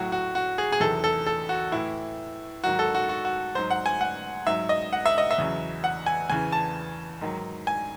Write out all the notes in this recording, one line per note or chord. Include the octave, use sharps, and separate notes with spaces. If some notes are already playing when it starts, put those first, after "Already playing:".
Already playing: A2 F#3 F#4
F#4
F#4
G#4
G#4
E2 C3 D#3 F#3 A4
A4
A4
F#4
A2 E3 E4
G#2 D#3 F#3 F#4
A4
F#4
F#4
F#4
G#2 F#3 C5
F#5
G#5
F#5
G#2 F#3 E5
D#5
F#5
E5
D#5
E5
E2 C#3 F#3
F#5
G#5
E2 C#3 E3 G#5
A5
G#2 D#3 F#3
G#5